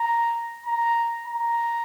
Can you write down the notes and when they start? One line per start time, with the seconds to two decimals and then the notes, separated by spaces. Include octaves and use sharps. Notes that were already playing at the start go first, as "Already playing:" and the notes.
Already playing: A#5
0.66 A#5
1.27 A#5